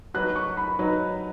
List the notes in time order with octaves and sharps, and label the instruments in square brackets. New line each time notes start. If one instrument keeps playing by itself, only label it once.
[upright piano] F#3 D#4 F#4 B4 [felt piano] F#6
[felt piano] C#6
B5
[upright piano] F#3 D#4 F#4 B4